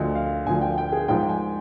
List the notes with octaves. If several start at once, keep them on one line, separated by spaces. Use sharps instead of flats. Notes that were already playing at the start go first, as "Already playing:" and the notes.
Already playing: D2 D3 F3 D#5
F5
D2 D3 F3 G#5
G5
G5
G#4
G#2 F3 G5
G#5